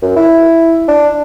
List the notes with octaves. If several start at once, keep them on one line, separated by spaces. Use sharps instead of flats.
F#2
E4
D4